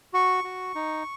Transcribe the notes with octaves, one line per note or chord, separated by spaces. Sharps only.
F#4 C#6
F#4
D#4